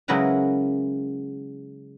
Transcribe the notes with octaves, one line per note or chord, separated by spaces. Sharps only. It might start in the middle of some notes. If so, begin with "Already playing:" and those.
C#3 F#3 G#3 E4 A#4 B4